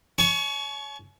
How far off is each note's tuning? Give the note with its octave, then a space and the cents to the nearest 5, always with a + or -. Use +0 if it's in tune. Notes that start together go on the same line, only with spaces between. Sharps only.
C#5 +15 G#5 +45 C#6 +0